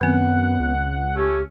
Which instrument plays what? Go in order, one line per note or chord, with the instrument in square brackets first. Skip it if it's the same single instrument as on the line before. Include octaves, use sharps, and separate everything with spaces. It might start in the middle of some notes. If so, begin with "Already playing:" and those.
[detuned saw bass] F#2 [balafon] D#3 C4 [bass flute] B3 [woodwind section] F#5
[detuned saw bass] C#2
[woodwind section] A3 C#4 [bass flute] G4